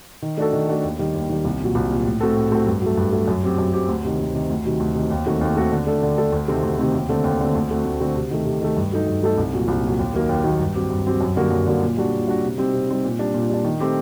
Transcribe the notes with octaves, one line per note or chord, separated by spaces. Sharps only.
D#3
A3 D4 F#4 A4
D#3
A3 D4 F#4 A4
D#2
D#3 G3
D#2
D#3 G3
C2
A#2 F#3
C2
A#2 F#3
A2
A3 C4 F#4 A4
A2
A3 C4 F#4 A4
G2
F#3 A3
G2
F#3 A3
F#2
F#3 C4 G4
F#2
F#3 C4 G4
D2
C3 D#3
D2
C3 D#3
D2
C3 D#3 F#3
D2
C3 D#3 F#3
D#2
D#3 A3 C4 F#4
D#2
D#3 A3 C4 F#4
D3
A3 D4 A4
D3
A3 D4 A4
D2
C3 D#3 A3 C4
D2
C3 D#3 A3 C4
D#2
D3 A3 C4
D#2
D3 A3 C4
D2
D3 A3 C4 F#4
D2
D3 A3 C4 F#4
C3
D#3 A3
C3
D#3 A3
G2
F#3 A3 D#4 A4
G2
F#3 A3 D#4 A4
C2
A#2 F#3
C2
A#2 F#3
D#2
D#3 F#3 A#3
D#2
D#3 F#3 A#3
G2
F#3 C4 G4
G2
F#3 C4 G4
F#2
D3 G3 A#3 F#4
F#2
D3 G3 A#3 F#4
A#2
G3 D4 F#4
A#2
G3 D4 F#4
C3
G3 C4 D#4
C3
G3 C4 D#4
A#2
G3 D4
A#2
G3 D4
D#3
A3 C4 G4